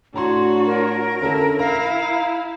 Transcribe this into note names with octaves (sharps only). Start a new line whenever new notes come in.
A2 D4 F#4 C#5 A#5 C6
A#4
D3 C#4 E4 A4
E4 F5 A#5